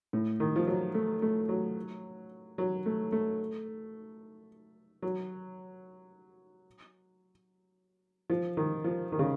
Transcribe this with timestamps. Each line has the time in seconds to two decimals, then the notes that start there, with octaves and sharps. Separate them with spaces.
0.13 A2
0.40 D#3
0.56 F3
0.67 F#3
0.94 A3
1.22 A3
1.49 F#3
2.58 F#3
2.86 A3
3.12 A3
5.02 F#3
8.30 F3
8.57 D#3
8.84 F3
9.12 D#3
9.19 C#3